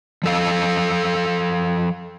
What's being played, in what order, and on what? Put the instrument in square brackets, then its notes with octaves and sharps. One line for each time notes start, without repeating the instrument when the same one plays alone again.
[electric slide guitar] F3 A4 F5